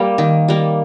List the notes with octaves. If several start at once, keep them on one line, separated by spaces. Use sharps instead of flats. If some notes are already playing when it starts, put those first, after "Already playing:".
Already playing: G3 A#3
D#3
G3 A#3